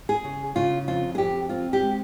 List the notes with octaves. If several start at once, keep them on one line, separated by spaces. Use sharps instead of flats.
G#4
C#3
C#3 F4
F2 F4
G#4
F2 G4
C4 F4
G4
G#3